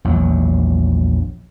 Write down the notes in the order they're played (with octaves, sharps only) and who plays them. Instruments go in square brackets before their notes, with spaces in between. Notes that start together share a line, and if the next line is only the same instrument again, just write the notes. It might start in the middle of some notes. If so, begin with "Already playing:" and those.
[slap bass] A#1 E2 F#3